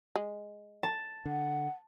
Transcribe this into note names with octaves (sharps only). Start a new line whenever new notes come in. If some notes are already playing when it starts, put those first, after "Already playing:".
G#3
A5
D3 F#5